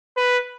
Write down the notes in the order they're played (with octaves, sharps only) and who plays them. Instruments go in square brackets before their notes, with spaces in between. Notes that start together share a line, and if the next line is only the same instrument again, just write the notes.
[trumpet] B4